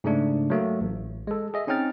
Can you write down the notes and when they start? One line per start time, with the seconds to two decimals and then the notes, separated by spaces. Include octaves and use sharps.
0.04 G#2 C#3 A3 D4
0.50 F#3 A3 A#3
0.81 A1
1.27 G#3 A4
1.54 G#4 D#5 E5
1.67 C4 C#4 D#4 G5 F6 A6